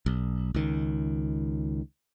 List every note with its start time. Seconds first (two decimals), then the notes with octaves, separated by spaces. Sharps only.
0.06 B1
0.54 C#2 D#3